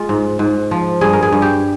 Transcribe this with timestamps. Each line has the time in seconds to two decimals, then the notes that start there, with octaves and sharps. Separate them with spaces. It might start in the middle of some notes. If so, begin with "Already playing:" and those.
Already playing: G#3 F4
0.09 G#2
0.39 G#2
0.71 F3
1.01 G2 G#4
1.13 A#4
1.23 G#4
1.32 G2
1.42 G4